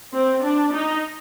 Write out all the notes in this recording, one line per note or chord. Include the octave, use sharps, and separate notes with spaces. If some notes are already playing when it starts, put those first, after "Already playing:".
C4
D4
D#4